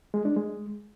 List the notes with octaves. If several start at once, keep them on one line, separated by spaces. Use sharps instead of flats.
G#3
D4
G#3